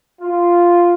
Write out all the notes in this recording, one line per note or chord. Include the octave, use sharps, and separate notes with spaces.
F4